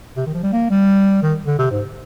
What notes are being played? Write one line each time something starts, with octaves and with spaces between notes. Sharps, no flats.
C3
D#3
F3
G3
A#3
G3
D#3
D3
C3
G#2